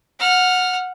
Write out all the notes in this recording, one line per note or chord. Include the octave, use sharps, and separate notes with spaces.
F#5 F6